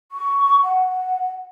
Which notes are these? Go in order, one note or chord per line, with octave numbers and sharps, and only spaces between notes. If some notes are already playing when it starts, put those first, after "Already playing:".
C#6
F#5